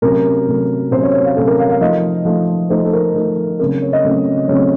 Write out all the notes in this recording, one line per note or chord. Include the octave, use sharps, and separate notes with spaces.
C3 F#3 A3 C#4 A#4
C3 F#3 A3 C#4
C3 F#3 A3 C#4 C5
C#5
C#5
F5
C3 F#3 A3 C#4 A4
A#4
F5
F5
F3 A3 D#4 D#5
F3 A3 D#4
F3 A3 D#4 C5
A4
A#4
F3 A3 D#4
C#3 F#3 A3 C4 A#4
C#5
D#5
C#3 F#3 A3 C4
C#3 F#3 A3 C4 C#5